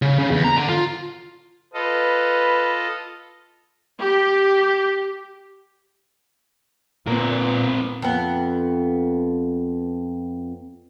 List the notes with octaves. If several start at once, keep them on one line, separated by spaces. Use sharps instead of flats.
C#3
C#3
E2
A#5
D3
F4
F4 A4 B4 D#5
G4
A#2 B3 C4 A#4
F2 B3